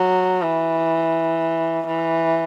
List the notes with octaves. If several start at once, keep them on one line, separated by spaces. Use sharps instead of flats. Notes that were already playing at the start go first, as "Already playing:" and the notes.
Already playing: F#3
E3
E3